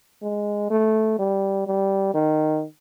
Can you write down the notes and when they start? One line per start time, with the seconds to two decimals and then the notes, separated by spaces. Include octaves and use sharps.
0.22 G#3
0.70 A3
1.19 G3
1.67 G3
2.14 D#3